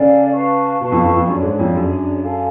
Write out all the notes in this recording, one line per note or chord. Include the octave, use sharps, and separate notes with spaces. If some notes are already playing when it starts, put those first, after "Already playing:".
Already playing: C#3 A4 D5 F5 G#5
B4 F5 A5 C#6
B2 B4 F5 A5 C#6
F2
F2
F2
F#2 D4 G#4 C#5
G#2
F2
F#2 D4 G#4 C#5
A4 F5 G#5